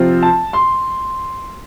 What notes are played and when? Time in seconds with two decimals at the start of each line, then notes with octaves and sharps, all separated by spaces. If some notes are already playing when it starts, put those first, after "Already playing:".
Already playing: C3 F3 C4 F4
0.23 A5
0.53 C6